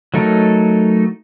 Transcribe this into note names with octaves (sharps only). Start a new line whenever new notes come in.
F#3 A3 D#4 A4 A#4